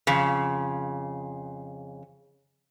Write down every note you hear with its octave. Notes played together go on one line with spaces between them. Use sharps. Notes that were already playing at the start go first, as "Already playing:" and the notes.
F2 C#3